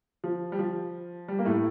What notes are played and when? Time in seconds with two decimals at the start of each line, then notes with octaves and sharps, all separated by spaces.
0.24 F3
0.52 G3
0.59 F3
1.28 G3
1.39 A#3
1.45 A2 A3